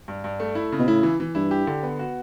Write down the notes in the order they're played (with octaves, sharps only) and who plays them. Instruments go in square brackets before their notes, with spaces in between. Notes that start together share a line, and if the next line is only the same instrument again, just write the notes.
[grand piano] G2
G2
A3
E4
C#3
[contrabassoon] B2
[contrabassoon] A2 [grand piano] E4
[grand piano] E3
E3
[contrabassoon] G2 [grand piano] E4
[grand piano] G4
D3
B3
F#4